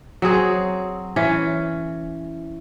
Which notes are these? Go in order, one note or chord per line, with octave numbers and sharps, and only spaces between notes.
F#3 C4 G#4
E3 C#4